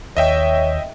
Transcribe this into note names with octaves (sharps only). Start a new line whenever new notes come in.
D#2 C#5 D#5 E5 G5